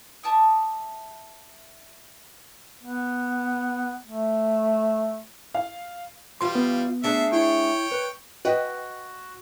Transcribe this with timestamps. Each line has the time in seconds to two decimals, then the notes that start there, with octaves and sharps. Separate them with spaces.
0.23 E5 A5 D6 D#6
2.84 B3
4.06 A3
5.54 F5
6.41 E3 G3 F4 F5 C6
6.55 B3
7.04 A3 D4 G#4 E5
7.33 E4 C#5 G5
7.91 B4
8.45 F#4 B4 D#5 G5